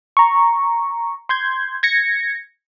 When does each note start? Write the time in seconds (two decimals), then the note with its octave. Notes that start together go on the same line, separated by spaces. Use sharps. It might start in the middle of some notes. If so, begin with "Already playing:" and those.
0.17 A#5 C#6
1.29 C6 G6 G#6
1.83 G#6 A#6 C#7